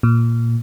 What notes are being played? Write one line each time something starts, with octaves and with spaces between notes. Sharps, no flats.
A#2